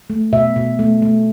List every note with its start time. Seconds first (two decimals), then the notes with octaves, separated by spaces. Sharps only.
0.10 A3
0.33 B2 E5
0.56 B2
0.79 A3
1.02 A3